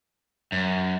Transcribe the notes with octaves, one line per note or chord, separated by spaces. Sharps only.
F#2